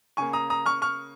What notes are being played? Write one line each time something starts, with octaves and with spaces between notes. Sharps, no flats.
C#3 A#3 G#5 C#6
A#5 D#6
A#5 D#6
C#6 F6
C#6 F6